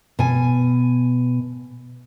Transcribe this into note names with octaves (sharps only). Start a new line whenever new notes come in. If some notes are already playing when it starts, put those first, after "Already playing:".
B2 G#5